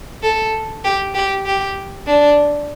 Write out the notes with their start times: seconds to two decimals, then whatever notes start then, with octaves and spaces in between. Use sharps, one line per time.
0.23 A4
0.84 G4
1.14 G4
1.46 G4
2.07 D4